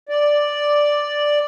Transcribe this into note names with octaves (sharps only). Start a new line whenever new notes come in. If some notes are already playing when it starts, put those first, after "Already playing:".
D5